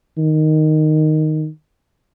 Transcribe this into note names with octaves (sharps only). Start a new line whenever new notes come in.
D#3